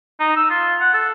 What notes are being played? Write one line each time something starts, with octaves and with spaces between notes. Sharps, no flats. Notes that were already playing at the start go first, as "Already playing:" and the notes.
D#4
E6
F4
F#5
A4